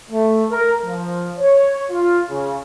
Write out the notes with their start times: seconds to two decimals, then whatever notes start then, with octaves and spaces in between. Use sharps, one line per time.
0.11 A3
0.50 A#4
0.84 F3
1.39 C#5
1.91 F4
2.29 C#3